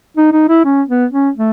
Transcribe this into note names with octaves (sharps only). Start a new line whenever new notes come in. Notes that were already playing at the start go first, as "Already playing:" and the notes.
D#4
D#4
E4
C#4
B3
C#4
A3